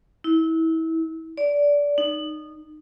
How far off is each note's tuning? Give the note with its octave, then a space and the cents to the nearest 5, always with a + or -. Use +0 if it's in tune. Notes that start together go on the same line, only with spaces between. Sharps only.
E4 -30
D5 -20
D#4 -20